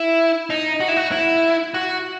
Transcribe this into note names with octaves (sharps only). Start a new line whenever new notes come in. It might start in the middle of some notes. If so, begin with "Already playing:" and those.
Already playing: E4
D#4
F#4
E4
F#4
E4
F#4